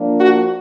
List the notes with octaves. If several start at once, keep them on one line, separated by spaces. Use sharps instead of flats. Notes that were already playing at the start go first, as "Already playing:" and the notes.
Already playing: F3 A#3 D4
F#4